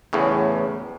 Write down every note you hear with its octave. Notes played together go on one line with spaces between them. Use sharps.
E2 A2 C#3